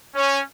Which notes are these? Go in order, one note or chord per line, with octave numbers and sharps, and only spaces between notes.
C#4